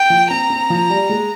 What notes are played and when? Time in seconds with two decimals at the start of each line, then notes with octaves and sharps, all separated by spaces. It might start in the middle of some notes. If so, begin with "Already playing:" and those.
Already playing: G5
0.10 F3
0.31 C4 A#5
0.50 C4
0.70 F3
0.90 G3
1.09 G#3